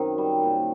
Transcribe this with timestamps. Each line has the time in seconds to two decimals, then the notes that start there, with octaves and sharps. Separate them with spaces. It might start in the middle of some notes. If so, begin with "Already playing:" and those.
Already playing: F#2 D#3 C4
0.18 G3
0.43 A#2